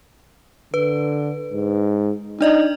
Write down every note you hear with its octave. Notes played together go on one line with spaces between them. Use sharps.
D3 B4
G#2
D4 D#4 D5 D#5